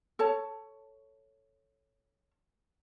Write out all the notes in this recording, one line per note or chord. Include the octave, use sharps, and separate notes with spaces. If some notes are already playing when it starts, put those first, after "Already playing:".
A4 C#5 A5